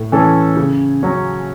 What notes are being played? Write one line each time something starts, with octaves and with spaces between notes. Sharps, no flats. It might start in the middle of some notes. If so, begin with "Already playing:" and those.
Already playing: A2
E3 C#4 A4
C#3
F#3 C#4